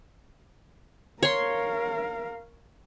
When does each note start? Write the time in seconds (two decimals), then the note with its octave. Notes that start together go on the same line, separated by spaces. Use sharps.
1.23 A#4 C#5 F5 C6